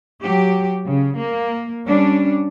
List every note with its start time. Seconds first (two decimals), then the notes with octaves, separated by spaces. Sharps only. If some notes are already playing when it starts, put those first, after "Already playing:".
0.23 F#3 G4
0.88 C#3
1.18 A#3
1.87 G3 C#4 D4